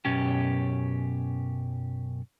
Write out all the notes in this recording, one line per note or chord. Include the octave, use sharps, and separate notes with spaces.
F#2 B2 C#4 G4